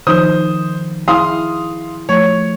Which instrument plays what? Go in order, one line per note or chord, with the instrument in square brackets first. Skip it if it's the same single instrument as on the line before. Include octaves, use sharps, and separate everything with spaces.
[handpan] D#3 F3 D#4 [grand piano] C5 D#6
[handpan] E4 G#4 [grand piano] F5 C6 D#6
[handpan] F3 A3 [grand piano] C#5